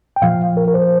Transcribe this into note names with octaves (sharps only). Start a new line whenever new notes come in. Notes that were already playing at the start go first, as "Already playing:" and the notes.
G5
A#2 F3 F5
A#4
A#4
C5